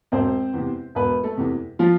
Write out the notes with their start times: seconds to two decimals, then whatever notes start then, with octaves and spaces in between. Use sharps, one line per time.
0.12 E1 C4 C5
0.54 E2 C3
0.95 E1 B3 B4
1.24 A3 A4
1.37 E2 C3
1.79 F3 F4